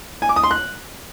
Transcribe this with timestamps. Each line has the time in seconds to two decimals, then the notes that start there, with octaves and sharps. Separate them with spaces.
0.22 G#5
0.29 D6
0.36 D#6
0.44 C6
0.51 F#6